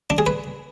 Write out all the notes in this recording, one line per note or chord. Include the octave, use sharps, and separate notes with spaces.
D4
G#4
B4